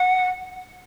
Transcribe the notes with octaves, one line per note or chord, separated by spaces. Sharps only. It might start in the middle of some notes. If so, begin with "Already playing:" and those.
Already playing: F#5